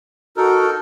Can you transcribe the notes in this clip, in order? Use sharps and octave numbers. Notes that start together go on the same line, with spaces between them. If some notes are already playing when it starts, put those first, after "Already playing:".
D#4 F#4 A4 A#4